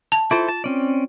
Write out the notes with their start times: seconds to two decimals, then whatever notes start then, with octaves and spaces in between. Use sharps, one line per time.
0.12 A5
0.31 E4 F4 A4 C5
0.48 A5
0.64 C4 C#4 D5